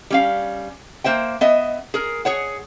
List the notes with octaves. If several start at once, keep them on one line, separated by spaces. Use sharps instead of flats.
G3 C#4 F5
A#3 C5 E5 G5
B3 D#5 E5
G#4 A#4
G#4 C#5 F#5